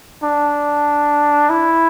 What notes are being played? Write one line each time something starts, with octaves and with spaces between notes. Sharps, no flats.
D4
E4